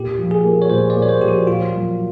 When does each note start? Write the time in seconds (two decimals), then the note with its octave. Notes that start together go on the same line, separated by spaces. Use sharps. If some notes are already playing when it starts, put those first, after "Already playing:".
Already playing: A#2 G4
0.18 F3
0.31 G#4
0.44 A#3
0.62 C#5
0.70 A#2 C5
0.90 D5
0.96 A#2
1.02 C#5
1.09 C5
1.21 F3 G4
1.28 F#4
1.47 A#2 F4
1.73 F#3